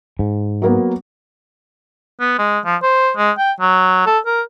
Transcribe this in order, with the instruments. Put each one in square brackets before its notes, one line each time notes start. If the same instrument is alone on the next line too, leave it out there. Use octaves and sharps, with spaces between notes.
[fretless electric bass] G#2
[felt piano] F#3 A#3 B3
[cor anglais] B3
G#3
F3
C5
G#3
G5
F#3
A4
A#4